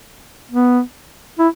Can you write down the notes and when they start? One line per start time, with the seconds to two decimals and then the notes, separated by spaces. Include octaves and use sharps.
0.52 B3
1.39 E4